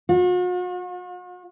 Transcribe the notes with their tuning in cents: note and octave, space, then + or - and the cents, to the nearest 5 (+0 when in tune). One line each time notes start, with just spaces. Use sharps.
F#4 -45